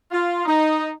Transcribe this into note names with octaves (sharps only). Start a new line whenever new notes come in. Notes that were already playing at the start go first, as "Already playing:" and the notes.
F4
D#4